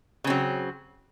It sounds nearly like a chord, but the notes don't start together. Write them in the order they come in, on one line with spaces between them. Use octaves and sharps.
C#3 C4 F#3